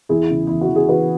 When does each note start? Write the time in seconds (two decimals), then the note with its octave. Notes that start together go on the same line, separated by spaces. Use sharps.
0.09 E2 E4 G#4
0.30 C#3
0.47 E2 E4
0.61 F#4
0.69 E3
0.76 G#4
0.89 E2 F#4 B4